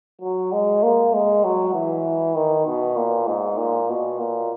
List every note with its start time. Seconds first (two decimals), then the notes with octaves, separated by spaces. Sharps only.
0.21 F#3
0.52 G#3
0.83 A#3
1.14 G#3
1.44 F#3
1.74 E3
2.36 D#3
2.67 B2
2.96 A#2
3.27 G#2
3.58 A#2
3.89 B2
4.19 A#2